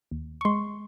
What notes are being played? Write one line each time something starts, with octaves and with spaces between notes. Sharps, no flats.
D#2
C#6
G#3 C6